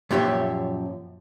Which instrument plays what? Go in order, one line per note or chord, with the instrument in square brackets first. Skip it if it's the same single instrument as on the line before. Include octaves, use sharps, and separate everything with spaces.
[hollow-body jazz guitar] F#2 A#2 F3 G4 C#5 E5